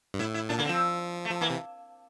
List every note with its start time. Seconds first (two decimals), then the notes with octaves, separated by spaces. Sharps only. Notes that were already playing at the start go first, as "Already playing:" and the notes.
0.14 G2
0.19 A2 E4
0.34 E4
0.49 A#2 D4
0.58 D3 A#3
0.65 F3 C4
1.25 A3
1.30 F3
1.41 E3 A#3
1.50 C3